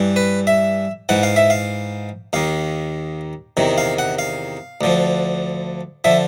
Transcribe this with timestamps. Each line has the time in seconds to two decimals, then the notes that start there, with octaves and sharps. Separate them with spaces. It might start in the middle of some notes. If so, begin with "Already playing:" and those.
Already playing: G2 E3
0.16 B4
0.47 E5
1.09 G#2 E3 F#5
1.23 F5
1.36 E5
1.50 F5
2.33 D#2 D#3 F5
3.57 E2 C3 D#3
3.78 F5
3.99 F#5
4.19 F5
4.81 D2 D3 F3
6.04 D3 F3 E5